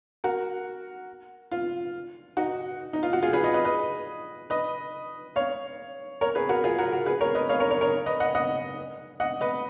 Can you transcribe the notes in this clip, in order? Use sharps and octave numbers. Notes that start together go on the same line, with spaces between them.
F#4 A#4
F4
D#4 F#4
D#4
F4
F#4
F4 G#4
G#4 B4
B4 D#5
B4 D#5
B4 D#5
B4 D#5
C#5 F5
A#4 C#5
G#4 B4
F#4 A#4
F4 G#4
F#4 A#4
F#4 A#4
G#4 B4
A#4 C#5
B4 D#5
C#5 F5
A#4 C#5
A#4 C#5
A#4 C#5
B4 D#5
D#5 F#5
D#5 F#5
D#5 F#5
B4 D#5